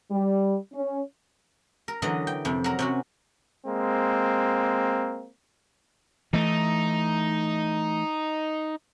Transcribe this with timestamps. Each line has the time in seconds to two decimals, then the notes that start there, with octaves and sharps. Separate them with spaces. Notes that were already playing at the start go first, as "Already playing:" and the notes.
0.11 G3
0.73 C#4
1.88 A#4
2.02 D3 E3 F#3 A#4 D#5 A#5
2.27 G5
2.45 F2 C3
2.64 F#3 A#4
2.79 C3 C#4 F#4
3.66 G#3 A#3 C4
6.33 E3 A3 D#4